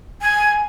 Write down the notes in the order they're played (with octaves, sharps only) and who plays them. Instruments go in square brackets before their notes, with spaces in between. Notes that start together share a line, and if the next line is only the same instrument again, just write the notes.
[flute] G#5